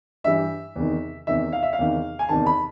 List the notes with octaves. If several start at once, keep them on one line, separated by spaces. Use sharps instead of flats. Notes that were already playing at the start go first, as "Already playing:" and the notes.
G2 E3 G3 E5
E2 C3 D#3
E2 C3 D#3 E5
F5
E5
F5
E2 C3 D#3
G#5
E2 C3 D#3 A5
B5